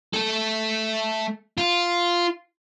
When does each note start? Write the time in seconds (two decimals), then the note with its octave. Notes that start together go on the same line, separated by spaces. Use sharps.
0.14 A3 A4
1.57 F4